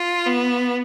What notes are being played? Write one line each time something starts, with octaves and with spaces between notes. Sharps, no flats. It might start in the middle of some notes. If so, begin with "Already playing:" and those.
Already playing: F4
B3